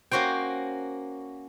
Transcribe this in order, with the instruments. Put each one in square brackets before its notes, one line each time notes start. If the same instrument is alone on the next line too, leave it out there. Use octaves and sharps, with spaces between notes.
[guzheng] A#3 C#4 F#4 C5 G5